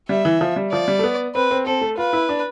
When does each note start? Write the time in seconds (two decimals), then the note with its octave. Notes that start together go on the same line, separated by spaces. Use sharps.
0.09 G3 E5
0.25 E3
0.41 F3
0.56 G3
0.72 F3 D5
0.88 G3
0.99 A3
1.03 B3
1.35 C4 B4
1.51 C4
1.66 C4 A4
1.81 A3
1.97 F4 B4
2.13 E4
2.29 D4